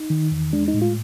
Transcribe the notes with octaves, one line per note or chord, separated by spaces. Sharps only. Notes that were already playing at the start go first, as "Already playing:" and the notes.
Already playing: D#4
D#3
E2
G#3 D4
D#4
A2
F4